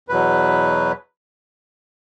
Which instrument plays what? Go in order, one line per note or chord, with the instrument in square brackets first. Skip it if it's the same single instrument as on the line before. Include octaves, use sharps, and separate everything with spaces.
[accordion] E2 B2 F#3 B4